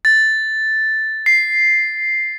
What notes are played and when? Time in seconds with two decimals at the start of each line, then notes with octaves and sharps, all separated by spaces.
0.05 A6
1.26 C7